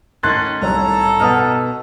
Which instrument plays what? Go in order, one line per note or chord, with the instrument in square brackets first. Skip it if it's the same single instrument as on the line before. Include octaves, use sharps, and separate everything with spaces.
[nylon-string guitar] A2 D#3 [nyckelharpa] C#4 [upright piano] C6 F#6 A6
[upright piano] C2 C#5 E6 [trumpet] A4 [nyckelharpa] A#5
[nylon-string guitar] B2 D#4 [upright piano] F#5 D#6 F6